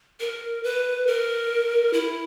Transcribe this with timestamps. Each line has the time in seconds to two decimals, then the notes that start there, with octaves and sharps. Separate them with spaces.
0.20 A#4
0.64 B4
1.07 A#4
1.93 E4